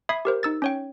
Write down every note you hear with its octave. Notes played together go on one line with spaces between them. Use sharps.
E5 B5 D#6 G#6 C7
G4 A#4 C5
D#4 E6 A6
C#4 C#5 G5